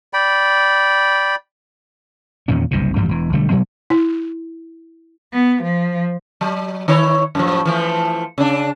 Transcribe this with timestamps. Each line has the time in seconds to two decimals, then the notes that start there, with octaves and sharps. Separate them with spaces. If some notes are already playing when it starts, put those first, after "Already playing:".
0.13 D5 G5 B5
2.48 E2 A#2 D#3 C#4
2.71 F#1 C2 G2 C3
2.96 A1 G2 F3 G3
3.09 E1 E3
3.33 B1 D3 G3 A3
3.50 B2 F#3 G#3 B3
3.90 E4
5.33 B3
5.63 F3
6.41 F#3
6.88 D#3 E4 C#5
7.35 F#2 A2 F3
7.65 E3 F3 A3
8.38 C#3 D4